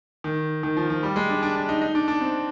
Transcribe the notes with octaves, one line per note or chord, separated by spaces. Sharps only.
D#3
D#3
F3
F3
G3
G#3
D4
D4
D4
D#4
D#4
D4
D4
C4